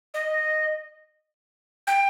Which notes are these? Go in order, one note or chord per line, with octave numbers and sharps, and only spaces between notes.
D#5
G5